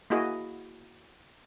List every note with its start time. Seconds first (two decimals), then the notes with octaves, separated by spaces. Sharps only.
0.10 A#3 E4 F#4 G#4 D#5